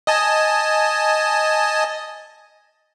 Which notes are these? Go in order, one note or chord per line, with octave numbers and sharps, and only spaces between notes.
D#5 G#5 A5